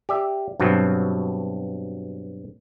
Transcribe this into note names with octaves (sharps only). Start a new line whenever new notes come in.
G4 D5 E5
G2 B2 F#3 C4